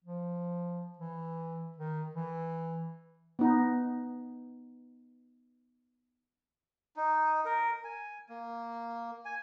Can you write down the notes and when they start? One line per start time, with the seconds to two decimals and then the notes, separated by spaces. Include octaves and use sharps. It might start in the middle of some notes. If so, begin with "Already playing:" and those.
0.04 F3
0.98 E3
1.78 D#3
2.15 E3
3.39 B3 D#4
6.96 D#4
7.45 A#4
7.84 G#5
8.29 A#3
9.25 G#5